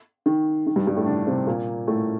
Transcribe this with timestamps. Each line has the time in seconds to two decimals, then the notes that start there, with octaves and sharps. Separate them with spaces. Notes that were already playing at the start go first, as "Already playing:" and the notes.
0.26 D#3
0.67 D#3
0.76 G2 G3
0.87 G2 G3
0.96 A2 A3
1.06 D3 D4
1.27 C3 C4
1.47 A#2 A#3
1.87 A2 A3